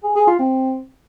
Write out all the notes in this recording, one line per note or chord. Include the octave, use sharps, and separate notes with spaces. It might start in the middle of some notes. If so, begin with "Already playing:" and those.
G#4
G#4
F4
C4